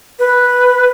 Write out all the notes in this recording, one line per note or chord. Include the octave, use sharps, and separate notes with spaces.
B4